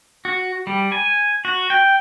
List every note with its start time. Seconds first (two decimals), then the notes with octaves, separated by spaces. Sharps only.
0.25 F#4
0.67 G3
0.92 G#5
1.45 F#4
1.70 G5